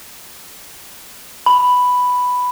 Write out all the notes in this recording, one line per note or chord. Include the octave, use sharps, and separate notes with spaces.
B5